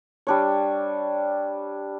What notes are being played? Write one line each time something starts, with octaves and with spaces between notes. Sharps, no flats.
G3 D4 C#5